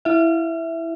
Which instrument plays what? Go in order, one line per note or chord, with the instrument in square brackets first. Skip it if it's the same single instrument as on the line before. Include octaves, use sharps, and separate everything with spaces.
[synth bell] E4 E5